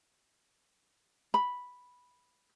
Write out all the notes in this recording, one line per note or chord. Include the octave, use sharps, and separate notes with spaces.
B5